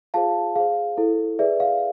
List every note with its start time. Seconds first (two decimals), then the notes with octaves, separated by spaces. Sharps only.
0.14 F4 G#4 C5 F5 A5
0.55 G#4 C5 F5
0.97 E4 A4 C5
1.39 G#4 B4 D5 E5
1.60 F5